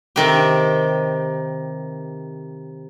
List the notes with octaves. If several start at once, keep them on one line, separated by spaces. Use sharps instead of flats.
C3 D#3 G4